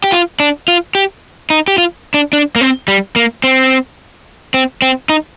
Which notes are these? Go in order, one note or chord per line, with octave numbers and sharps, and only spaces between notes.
G4
F4
D4
F4
G4
D#4
G4
F4
D4
D4
A#3
C4
G3
A#3
C4
C4
C4
D#4